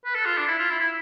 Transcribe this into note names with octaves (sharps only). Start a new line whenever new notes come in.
B4
A4
F4
D4
E4
F4
E4
E4